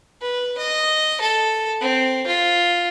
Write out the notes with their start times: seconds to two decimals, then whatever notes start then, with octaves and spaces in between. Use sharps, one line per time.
0.21 B4
0.58 D#5
1.21 A4
1.81 C4
2.27 F4